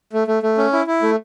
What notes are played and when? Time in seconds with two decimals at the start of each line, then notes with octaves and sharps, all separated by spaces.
0.13 A3
0.28 A3
0.43 A3
0.58 C#4
0.73 E4
0.87 E4
1.02 A3